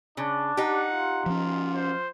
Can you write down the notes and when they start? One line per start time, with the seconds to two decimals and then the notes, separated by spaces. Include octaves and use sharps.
0.17 C#3 D4
0.57 D#4 G4 F#5
0.92 F4
1.26 F3 C#4
1.75 C5